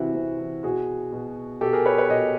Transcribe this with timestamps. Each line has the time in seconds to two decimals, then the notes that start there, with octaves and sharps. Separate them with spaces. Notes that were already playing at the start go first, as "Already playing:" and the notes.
Already playing: C3 E3 E4 F#4
0.15 C3
0.39 E3
0.63 B2 F#4 G#4
1.12 B2
1.61 B2 G4 A4
1.73 G#4 A#4
1.86 B4 C#5
1.98 B4 C#5
2.10 B2 C#5 D#5